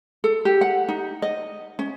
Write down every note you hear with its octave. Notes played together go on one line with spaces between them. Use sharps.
A4
G4
F#5
D#4
D#5
C#4